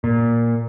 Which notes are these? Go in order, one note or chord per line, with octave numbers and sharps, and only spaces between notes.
A#2